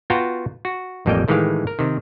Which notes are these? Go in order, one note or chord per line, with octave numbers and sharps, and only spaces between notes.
B3 F4 F#4 G5 A#5
F#4
A1 F2 G3 A#3 D#5 G5
A2 D#3 E3 G#3 G4 F5
A#4
C3 D#3